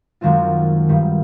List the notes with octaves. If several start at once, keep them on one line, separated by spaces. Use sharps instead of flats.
F#2 D#3 G#3 C4 F4
G2 D#3 G3